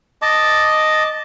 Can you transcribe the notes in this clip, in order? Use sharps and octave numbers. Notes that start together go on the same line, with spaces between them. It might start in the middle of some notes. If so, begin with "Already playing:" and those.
D#5 A5 D6